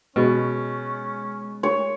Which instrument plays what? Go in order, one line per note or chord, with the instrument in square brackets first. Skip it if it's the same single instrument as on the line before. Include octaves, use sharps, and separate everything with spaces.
[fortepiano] B2 [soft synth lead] G#3 [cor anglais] C#4
[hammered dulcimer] C#5